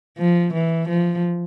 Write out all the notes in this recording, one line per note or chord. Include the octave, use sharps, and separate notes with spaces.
F3
E3
F3